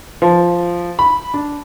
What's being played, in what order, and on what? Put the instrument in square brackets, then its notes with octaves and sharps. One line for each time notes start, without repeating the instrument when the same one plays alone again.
[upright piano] F3
B5
D4